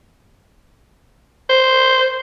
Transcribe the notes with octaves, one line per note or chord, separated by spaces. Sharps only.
C5